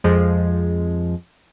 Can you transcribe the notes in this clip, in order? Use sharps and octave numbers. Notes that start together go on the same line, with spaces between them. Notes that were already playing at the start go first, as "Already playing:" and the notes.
F2 F3 G#3